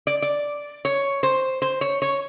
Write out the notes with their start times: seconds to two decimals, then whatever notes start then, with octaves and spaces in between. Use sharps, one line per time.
0.07 D5
0.22 D5
0.85 C#5
1.23 C5
1.62 C5
1.81 C#5
2.02 C#5